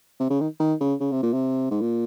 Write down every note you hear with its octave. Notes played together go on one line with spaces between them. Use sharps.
C3
C#3
D#3
D#3
C#3
C#3
C3
A#2
C3
G#2
A#2